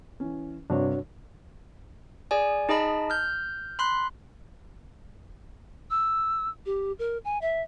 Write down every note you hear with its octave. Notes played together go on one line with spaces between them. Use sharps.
E3 C#4
G2 C3 D4 F#4 C#5
G#4 D5 G#5
D#4 G#4 D#5 A5 B5
F6 G6
B5 C6 F#6
E6
G4
A#4
G#5
E5